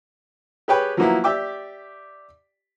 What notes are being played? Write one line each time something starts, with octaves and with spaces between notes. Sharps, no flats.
G4 G#4 B4 C#5 G5 B5
F3 F#3 A#3 B3 E4
G4 D5 E5 G5 D6